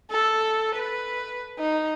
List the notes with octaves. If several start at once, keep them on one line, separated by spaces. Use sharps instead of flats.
A4
B4
D#4